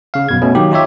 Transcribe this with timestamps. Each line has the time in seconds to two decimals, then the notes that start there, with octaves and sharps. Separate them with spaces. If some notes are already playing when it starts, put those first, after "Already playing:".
0.14 C#3 F5
0.29 F#2 B2 G#6
0.41 B2 A3 C#4
0.55 D#3 F#3 A#3 D#4 G4
0.71 D#4 F4 G4 C#5 E5